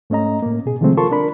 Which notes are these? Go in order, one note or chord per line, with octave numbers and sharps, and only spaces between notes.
G#2 A3 C#4 D#5 A#5
A2 A#3
B2 G#4
C3 D#3 F3 G#3 A3 C4
F4 A4 A#4 A5 C6 C#6
D4 A#4 B5